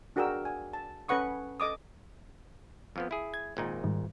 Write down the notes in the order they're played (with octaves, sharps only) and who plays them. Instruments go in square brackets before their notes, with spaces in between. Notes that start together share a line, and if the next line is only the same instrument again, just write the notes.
[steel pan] D4 F#4 G#4 A#4 G5 E6
G#5
A5
C#4 A4 B4 F#5 C#6 D#6
A4 D#5 D6 D#6
[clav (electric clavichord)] F2 F3 B3
E4 G#4
[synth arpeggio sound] G#6
[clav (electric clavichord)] G#1 A#2 D#4
[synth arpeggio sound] G#2 D#3 G3